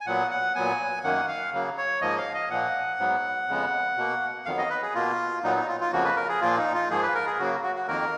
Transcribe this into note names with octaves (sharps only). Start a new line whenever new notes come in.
G#5
A#2 F#3 B3 F#5
F#5
A#2 F#3 B3 G#5
F#2 D#3 A#3 F#5
F5
C#3 F#3 A#3
C#5
G#2 F3 A#3 D#5
F5
D#5
A#2 F3 A#3 F#5
G#2 F#3 B3
F2 C#3 G#3 B3
B2 A#3
F2 D#3 F#3 B3 F5
D#5
B4
G#4
B2 A#3 F4
A#2 F#3 B3 D#4
D#4
F4
F4
F2 C#3 F3 A#3 F#4
B4
A#4
G#4
A#2 F3 A#3 F4
D#4
F4
G#2 F3 A#3 G#4
B4
A#4
G#4
C#3 F#3 A#3 F#4
F#4
F#4
F2 D#3 A#3 A#4